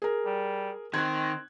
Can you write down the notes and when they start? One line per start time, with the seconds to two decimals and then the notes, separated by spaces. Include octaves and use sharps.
0.02 G#4 A#4
0.25 G3
0.94 D#3 C4 F#6 G#6